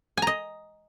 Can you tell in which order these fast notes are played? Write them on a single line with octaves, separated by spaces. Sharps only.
G#5 A#5 D#5